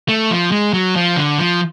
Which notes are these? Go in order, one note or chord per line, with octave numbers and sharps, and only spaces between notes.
A3
F3
G#3
F#3
F3
D3
F3